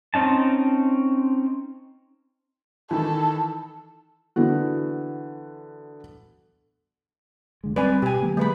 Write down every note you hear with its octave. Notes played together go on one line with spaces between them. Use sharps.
C4 C#4 D#4 A5
D#3 E3 A4
D3 E3 B3 F#4
F1 D3 G#3
G3 C4 B4 D5 G#5
B2 G4 G#5
D3 F#3 A#3
G#3 B4 B5